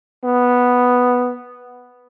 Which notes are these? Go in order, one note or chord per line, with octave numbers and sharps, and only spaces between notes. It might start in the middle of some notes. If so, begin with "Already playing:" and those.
B3